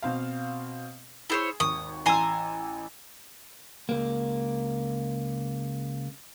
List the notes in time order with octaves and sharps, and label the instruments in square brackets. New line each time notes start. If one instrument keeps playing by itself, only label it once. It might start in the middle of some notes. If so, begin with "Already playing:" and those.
[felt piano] B2 C4 F5
[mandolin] E4 C5 C#5 [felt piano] G#4
[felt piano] G#1 D#2 C#6 [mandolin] D#6
[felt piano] A1 E6 [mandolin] G#5 A#5 C6
[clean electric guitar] C#2 A#3